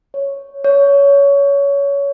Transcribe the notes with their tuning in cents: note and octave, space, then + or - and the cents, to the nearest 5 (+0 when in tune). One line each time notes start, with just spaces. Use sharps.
C#5 +0
C#5 +20